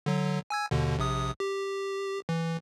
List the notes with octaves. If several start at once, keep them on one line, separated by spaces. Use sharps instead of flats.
D3 F#3
G#5 E6 G#6
D#2 B2 D3
A#1 C3 D#6
G4
E3